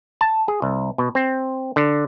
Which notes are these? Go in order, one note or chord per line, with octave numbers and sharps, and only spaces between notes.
A5
G#4
C2
B2
C4
D3